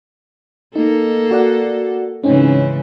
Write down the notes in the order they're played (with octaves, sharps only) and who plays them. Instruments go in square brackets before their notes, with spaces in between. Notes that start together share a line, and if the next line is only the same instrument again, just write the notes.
[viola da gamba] A#3 A4 [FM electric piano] D#4
[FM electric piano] F#4 D5 F#5
[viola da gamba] G#2 C#3 E3 [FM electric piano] C4 C#4 D#4